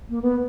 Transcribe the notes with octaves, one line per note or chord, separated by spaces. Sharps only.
A#3
B3